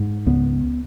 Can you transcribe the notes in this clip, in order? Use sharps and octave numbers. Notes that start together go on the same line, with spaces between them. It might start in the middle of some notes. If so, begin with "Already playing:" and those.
Already playing: G#2
C#2 B3